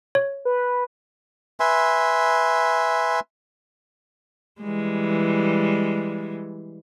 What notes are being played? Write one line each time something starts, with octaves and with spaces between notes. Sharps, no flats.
C#5
B4
B4 E5 G#5 C6
E3 G3 G#3